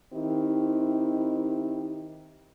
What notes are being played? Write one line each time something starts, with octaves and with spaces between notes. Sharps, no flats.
D#3 C4 D#4 E4 G4